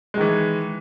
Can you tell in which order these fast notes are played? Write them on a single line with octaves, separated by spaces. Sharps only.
G#3 D#3 E3